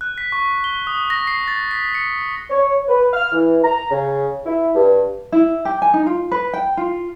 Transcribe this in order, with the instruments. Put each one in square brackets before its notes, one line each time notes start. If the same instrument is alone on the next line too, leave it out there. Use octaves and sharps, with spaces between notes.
[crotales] F#6
B6
C#6
G7
D#6
A#6
C7
A6
B6
C#7
[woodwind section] C#5
B4
F6
E3
A#5
C#3
E4
G2
[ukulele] E4
G4
G#5
D#4
F4
B4
G5
F4